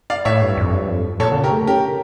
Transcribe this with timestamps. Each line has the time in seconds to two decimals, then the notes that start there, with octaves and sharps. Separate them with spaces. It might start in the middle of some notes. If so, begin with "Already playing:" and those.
0.10 D5 F5
0.25 A2 C#5 E5
0.42 G2
0.57 F2
0.73 G2
0.88 F2
1.20 A#2 A4 C#5
1.32 D3
1.36 C#3
1.44 G4 A#4
1.51 A3
1.67 C#4 G4 A#4